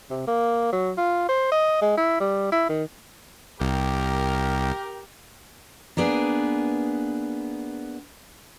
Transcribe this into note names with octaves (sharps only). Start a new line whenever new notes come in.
C3
A#3
F#3
F4
C5
D#5
G#3
E4
G3
E4
D#3
C2 G4 A#4
A#3 B3 D4 G#4